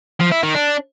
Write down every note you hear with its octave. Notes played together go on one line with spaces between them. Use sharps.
F3
E4
D#3
D4